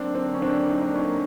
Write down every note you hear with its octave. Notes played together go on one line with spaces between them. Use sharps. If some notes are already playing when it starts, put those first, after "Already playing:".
Already playing: D3 F#3 A#3 C4 D4
C4 D4
C#4
C4 D4
D#4
D4
C#4 D#4